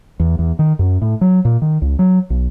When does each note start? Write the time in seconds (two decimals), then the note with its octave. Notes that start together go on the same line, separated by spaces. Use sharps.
0.20 E2
0.39 E2
0.59 D#3
0.79 F#2
1.02 A2
1.21 F#3
1.45 A#2
1.62 D#3
1.82 C#2
1.99 F#3
2.30 B1